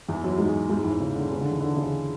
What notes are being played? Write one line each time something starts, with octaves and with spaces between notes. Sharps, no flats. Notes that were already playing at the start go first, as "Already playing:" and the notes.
E2 E3
F#2 F#3
G#2 G#3
G#2 G#3
E2 E3
C#3
D3
C#3
D3
E2 E3
D3
C#3